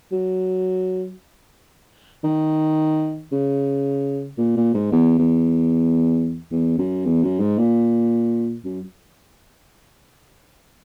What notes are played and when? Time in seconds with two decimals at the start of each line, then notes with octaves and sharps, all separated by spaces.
0.11 F#3
2.24 D#3
3.32 C#3
4.38 A#2
4.56 A#2
4.74 G#2
4.92 E2
5.18 E2
6.51 E2
6.78 F#2
7.05 E2
7.23 F#2
7.40 G#2
7.58 A#2
8.64 F#2